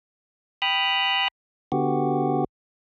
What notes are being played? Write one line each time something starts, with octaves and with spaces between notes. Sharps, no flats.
G5 B5 D#6 F6 F#6
D3 B3 F#4 G4